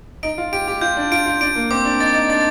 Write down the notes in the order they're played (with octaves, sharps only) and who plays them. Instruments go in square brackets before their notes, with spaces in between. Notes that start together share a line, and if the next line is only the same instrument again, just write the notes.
[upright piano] D#4 [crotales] D7
[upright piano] F4
[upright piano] G4 [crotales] D7
[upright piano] G4
[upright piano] F4 [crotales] G6
[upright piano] D4
[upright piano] F4 [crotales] D7
[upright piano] F4
[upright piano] D4 [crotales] D7
[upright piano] A#3
[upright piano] C4 [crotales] D6
[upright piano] D4
[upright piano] D#4 [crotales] A6
[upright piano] D#4
[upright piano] D4 [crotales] A6